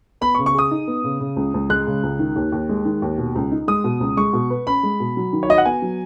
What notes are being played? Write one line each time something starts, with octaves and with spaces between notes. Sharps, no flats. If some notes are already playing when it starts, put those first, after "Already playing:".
B3 B5
C#6
C#3
C#6
G#4 D#6
D#4
B3
C#3
C#3
C#2
C#2
G#3 F#6
C#3
C#2
D#3
D#2
D#2
G#3
D#3
D#2
B2
C#2
D#4
G#3 D#6
B2
C#2
G#3 C#6
B2
B4
C#4 B5
G#3
B2
F#3
D#3
C#5
F#4 D#5
F#5
B3 G#5
F#3